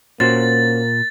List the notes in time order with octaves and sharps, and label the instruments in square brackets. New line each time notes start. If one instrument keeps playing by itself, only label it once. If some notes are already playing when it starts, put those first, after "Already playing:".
[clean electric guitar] A#2 [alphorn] A#3 [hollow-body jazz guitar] C#4 F#4 C5 [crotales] A6